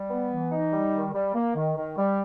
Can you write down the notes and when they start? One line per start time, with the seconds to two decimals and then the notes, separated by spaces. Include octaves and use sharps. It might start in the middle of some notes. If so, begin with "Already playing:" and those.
Already playing: G3
0.09 B3
0.30 E3
0.51 D#4
0.72 G3
0.93 D#3
1.14 G3
1.35 A#3
1.56 D#3
1.76 D#3
1.98 G3